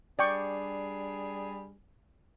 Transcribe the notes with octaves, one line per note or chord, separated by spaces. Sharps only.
G3 D4 G#4 D5 G5 C#6